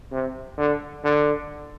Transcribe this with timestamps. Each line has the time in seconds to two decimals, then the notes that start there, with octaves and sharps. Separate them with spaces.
0.12 C3
0.58 D3
1.04 D3